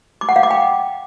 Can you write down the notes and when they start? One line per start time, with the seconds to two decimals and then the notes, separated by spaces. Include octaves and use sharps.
0.21 D6
0.29 F#5
0.36 F5
0.43 D6
0.51 G5